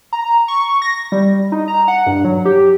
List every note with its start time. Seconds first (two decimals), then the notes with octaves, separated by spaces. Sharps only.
0.13 A#5
0.48 C#6
0.82 A#6
1.12 G3
1.52 D#4
1.68 A#5
1.88 F#5
2.07 G2
2.25 F#3
2.45 G4